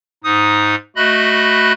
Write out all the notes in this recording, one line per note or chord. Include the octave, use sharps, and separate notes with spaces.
G#2 D#4 D#6
A3 F#4 D#5 B5 F#6